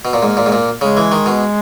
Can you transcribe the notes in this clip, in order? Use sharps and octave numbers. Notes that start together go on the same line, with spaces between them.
B2
A#2
G#2 A#3
A#2
G#2
A#2
C#3 G#3
E3
D#3
B2